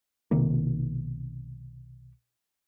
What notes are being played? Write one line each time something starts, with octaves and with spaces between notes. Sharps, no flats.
B1 C3 D#3 A#3